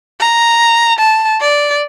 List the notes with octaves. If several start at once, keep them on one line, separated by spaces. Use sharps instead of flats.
A#5
A5
D5